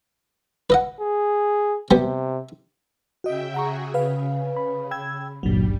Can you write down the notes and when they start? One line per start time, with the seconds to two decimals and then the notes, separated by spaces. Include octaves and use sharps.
0.70 B4 D#5 F#5
1.01 G#4
1.91 C3 G3 B3 C5
3.24 C#3 F#4 D#5 E5 G5
3.54 F#4 G#4 F#5 A#5 C#6
3.94 C#3 B4 F5
4.57 B5
4.91 G5 E6 G#6
5.43 G#1 C#2 G2 A#2 F#3 G3